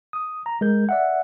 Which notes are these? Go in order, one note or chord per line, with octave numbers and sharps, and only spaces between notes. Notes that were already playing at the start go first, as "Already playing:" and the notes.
D#6
A#5
G#3 A#4 G6
D5 E5 F#5